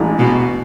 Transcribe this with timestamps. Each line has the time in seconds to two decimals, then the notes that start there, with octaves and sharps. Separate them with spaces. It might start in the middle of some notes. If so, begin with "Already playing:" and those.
Already playing: A1 A2 G#3 D4
0.19 B2